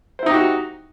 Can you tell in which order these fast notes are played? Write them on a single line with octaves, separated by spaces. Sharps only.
C5 E4 D#4 G4 F#4